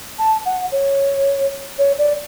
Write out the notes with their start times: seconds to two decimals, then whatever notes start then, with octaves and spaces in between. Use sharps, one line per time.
0.19 A5
0.45 F#5
0.72 C#5
1.78 C#5
1.98 D5